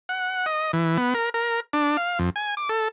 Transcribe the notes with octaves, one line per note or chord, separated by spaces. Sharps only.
F#5
D#5
E3
B3
A#4
A#4
D4
F5
F2
G#5
D6
A4